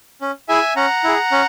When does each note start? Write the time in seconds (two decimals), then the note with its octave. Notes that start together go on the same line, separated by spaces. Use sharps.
0.21 C#4
0.49 E4 G#4 E5 G#5
0.76 C#4 F#5 A#5
1.04 E4 G#4
1.32 C#4